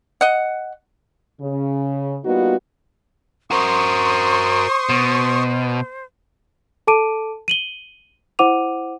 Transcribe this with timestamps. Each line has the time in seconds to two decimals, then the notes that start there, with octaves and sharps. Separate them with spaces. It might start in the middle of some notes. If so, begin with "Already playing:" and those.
0.21 D#5 F#5
1.41 C#3
2.25 G3 A#3 B3 D#4 F4 F#4
3.51 F#4 A#4 C5 C6 C#6 D#6
4.89 B2
6.87 A4 A5 D6 D7 D#7
7.48 D#7 F#7 G7
8.39 E4 C5 F#5 D6 D#7 F7